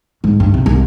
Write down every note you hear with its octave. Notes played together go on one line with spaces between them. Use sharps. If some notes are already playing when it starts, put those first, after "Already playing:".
G#2
G2
C3
C2